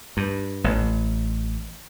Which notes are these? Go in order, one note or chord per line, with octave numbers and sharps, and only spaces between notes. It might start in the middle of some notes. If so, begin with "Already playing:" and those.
G2
A1